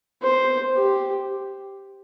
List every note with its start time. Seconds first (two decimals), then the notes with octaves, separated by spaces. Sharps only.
0.22 C5
0.75 G4